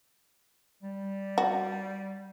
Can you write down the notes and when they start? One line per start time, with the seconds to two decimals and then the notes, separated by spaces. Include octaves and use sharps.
0.83 G3
1.38 F#4